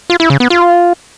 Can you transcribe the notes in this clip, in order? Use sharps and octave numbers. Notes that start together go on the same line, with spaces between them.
F4
E4
C#3
B3
F4